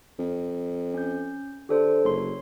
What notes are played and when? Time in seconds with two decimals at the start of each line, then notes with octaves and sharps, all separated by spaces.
0.19 F2
0.94 C#4 G6
1.69 D3 G4 A4 C5
2.05 F#1 C#5 C6